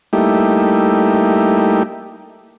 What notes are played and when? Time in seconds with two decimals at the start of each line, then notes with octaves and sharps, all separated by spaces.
0.13 G3 A3 A#3 D#4 E4 G4